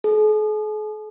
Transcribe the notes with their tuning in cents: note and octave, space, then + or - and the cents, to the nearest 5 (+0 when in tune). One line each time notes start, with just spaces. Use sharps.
G#4 +45